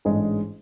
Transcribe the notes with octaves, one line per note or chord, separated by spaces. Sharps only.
A1 G#2 G#3 D4 G#4